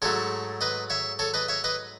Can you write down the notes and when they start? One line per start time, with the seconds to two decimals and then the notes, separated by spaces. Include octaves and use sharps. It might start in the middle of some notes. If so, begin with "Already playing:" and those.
0.02 G#2 F#3 A3 A4 C#5
0.61 B4 D#5
0.90 C#5 E5
1.19 A4 C#5
1.34 B4 D#5
1.48 C#5 E5
1.64 B4 D#5